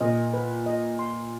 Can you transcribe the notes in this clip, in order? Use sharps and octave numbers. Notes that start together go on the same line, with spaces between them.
A#2 D#5
B4
D#5
C6